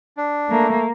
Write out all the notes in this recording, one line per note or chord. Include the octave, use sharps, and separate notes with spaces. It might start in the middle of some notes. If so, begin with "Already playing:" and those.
D4
A3 A#3